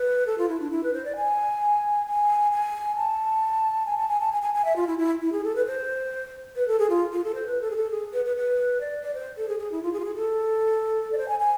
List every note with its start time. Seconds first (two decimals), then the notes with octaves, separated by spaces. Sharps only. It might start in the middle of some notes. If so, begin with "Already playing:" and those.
Already playing: B4
0.26 A4
0.38 F4
0.49 E4
0.60 D4
0.71 E4
0.83 B4
0.93 C5
1.05 D5
1.16 G#5
2.07 G#5
2.52 G#5
2.96 A5
3.86 G#5
3.97 A5
4.08 G#5
4.20 A5
4.32 G#5
4.42 G#5
4.54 G#5
4.65 E5
4.76 F4
4.87 E4
4.98 E4
5.21 E4
5.32 G#4
5.44 A4
5.55 B4
5.66 C5
6.56 B4
6.68 A4
6.79 G#4
6.90 F4
7.12 F4
7.24 A4
7.35 C5
7.46 B4
7.61 A4
7.71 G#4
7.76 A4
7.90 G#4
8.13 B4
8.25 B4
8.36 B4
8.81 D5
9.03 D5
9.14 C5
9.37 A4
9.48 G#4
9.59 G#4
9.71 E4
9.83 F4
9.93 G#4
10.00 F4
10.04 G#4
10.16 A4
11.12 D5
11.18 C5
11.28 G#5
11.40 G#5